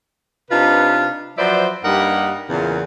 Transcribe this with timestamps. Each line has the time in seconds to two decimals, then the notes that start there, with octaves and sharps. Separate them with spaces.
0.50 C3 D4 D#4 F4 B4
1.38 F3 F#3 B4 C5 D5 E5
1.84 G2 G3 A#3 D#4 A#4 F#5
2.49 E2 A#2 C#3